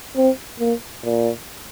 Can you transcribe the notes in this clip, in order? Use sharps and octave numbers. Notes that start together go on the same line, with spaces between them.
C4
A#3
A#2